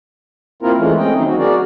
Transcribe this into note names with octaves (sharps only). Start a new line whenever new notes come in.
A#3 C4 E4 F4 A#4
E3 G#3 A3 C#4
A3 C4 C#4 D#5 G5
D#3 F#3 A#3 C4 D#4
F#4
F#4 G#4 A#4 D5